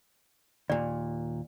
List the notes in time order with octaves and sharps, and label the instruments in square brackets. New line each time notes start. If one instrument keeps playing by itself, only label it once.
[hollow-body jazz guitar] D#2 A#2 [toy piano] D5